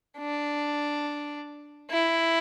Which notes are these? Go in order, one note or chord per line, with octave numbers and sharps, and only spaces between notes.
D4
E4